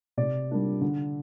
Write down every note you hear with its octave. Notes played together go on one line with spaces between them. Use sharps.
C3 D5
G3 A#3 D4 F4
D3